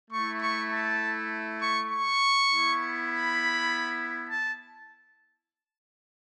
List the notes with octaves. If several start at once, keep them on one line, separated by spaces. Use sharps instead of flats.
A3 E4 C#6
C#6
A5
C#6
C#6
B3 E4
B5
A5